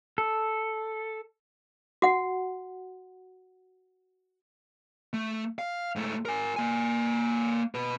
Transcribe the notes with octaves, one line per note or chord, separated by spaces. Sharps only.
A4
F#4 F#5
A3
F5
G#2 A3
A#4 G#5
A#3 G#5
B2 B4